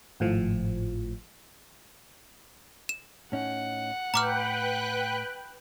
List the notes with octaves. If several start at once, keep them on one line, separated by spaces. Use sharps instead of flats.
G#1 A2 F3
E7
A2 C#4 D#4 F#5
A2 B4 G5 A#5 D6 F6 F#6